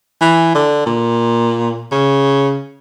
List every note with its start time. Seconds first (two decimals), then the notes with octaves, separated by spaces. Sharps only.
0.21 E3
0.55 D3
0.86 A#2
1.92 C#3